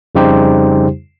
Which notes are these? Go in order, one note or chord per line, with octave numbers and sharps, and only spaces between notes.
F2 C#3 G3 D#4 G4 C5